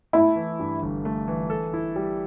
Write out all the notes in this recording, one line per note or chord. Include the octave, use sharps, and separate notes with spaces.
A3 E4
E3
G2
G1
A3
E3
A4
E4
G3